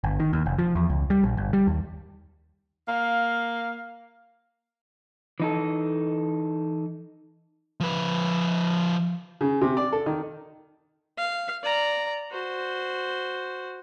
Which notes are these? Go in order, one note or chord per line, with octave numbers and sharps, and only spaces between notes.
G1
D#3
D#2
F1
F3
E2
C#2
G3
A#1
G1
G3
D#2
A#3 F5
E3 D#4 A4
F3 B4
C#3
C3
D5
A4
D#3
F5
D5 A#5
F#4 C5